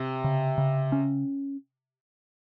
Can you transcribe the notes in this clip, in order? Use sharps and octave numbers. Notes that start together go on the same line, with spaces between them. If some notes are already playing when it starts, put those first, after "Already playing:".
Already playing: C3
C#3
C#3
C#4